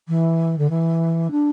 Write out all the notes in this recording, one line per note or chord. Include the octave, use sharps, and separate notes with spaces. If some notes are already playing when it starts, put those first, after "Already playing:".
E3
D3
E3
D4